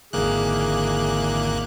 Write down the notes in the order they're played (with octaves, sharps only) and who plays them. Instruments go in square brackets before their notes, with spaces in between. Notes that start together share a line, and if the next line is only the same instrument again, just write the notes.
[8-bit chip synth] G#1 A#3 F#6 [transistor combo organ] E2 D3 [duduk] G#4